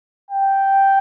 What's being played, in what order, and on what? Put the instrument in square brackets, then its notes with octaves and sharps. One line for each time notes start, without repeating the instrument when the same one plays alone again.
[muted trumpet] G5